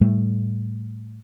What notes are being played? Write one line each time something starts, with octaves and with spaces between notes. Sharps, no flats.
A2 G3 A3